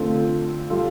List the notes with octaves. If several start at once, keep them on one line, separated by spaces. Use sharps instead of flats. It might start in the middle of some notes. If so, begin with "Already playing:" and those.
Already playing: D3 A3 C4 F4 A4
G3 F4 A4